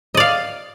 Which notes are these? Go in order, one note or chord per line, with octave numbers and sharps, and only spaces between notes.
D5 D#5 F5